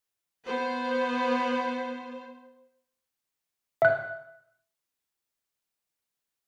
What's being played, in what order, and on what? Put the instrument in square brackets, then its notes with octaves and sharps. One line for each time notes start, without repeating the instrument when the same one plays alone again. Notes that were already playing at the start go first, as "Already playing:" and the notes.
[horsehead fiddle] B3 [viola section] C5
[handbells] E5 F#6